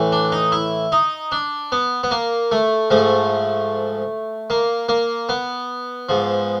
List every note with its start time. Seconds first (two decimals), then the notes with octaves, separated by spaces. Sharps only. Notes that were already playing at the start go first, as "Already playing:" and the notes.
Already playing: A2 E3
0.12 D4
0.32 D#4
0.52 E4
0.92 D#4
1.32 D4
1.72 B3
2.03 B3
2.11 A#3
2.52 A3
2.90 G#2 F3 A3
4.50 A#3
4.89 A#3
5.29 B3
6.09 G#2 F3